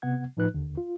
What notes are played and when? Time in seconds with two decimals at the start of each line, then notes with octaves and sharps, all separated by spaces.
0.02 C3 B3 F#5 G#6
0.37 A2 F3 D#4 B4 F#6
0.54 D#2 D3
0.77 F4